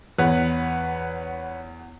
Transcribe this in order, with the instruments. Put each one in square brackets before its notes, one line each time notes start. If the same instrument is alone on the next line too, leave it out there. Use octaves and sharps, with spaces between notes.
[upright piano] E2 [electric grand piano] B4 C#5 F#5